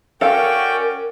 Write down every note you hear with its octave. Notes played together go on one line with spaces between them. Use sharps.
C#4 F#4 A4 A#4 D5 F5 G5